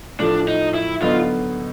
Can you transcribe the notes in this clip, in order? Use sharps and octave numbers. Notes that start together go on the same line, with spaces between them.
A2 F3 A3 D4
D#4
E4
D3 F#3 B3 D#4 F4